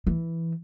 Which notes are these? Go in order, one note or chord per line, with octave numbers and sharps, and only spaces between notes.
E3